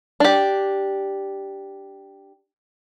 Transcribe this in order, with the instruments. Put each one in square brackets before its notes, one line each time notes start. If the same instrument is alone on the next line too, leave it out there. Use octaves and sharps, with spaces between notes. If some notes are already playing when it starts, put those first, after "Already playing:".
[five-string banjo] D4 G4